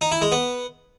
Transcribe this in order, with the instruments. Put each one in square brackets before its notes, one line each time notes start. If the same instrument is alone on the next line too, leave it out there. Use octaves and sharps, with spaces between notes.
[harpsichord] D#4
E4
G#3
B3